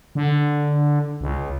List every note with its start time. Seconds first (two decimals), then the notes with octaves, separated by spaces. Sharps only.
0.15 D3
1.21 C#2